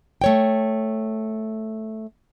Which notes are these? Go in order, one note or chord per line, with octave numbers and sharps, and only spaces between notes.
A3 C#5 G5